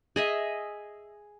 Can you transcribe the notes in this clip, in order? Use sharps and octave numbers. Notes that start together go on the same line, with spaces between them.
G#4 D#5 E5